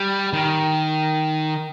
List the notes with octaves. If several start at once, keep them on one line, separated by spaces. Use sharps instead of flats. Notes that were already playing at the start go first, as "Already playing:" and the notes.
Already playing: G3
D#3